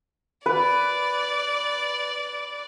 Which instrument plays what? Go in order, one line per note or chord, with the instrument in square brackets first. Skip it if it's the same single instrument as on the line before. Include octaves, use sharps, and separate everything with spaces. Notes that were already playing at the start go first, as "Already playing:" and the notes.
[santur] B4 [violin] D5